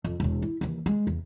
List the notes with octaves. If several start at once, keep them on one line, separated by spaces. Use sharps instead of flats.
F2
E1 E2
E4
D#2 E3
G#3
E2